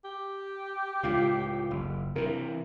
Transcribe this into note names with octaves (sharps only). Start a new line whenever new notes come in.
G4
C#2 A2 F4
F#1
C3 E3 A#4